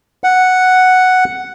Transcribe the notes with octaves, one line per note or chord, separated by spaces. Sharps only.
F#5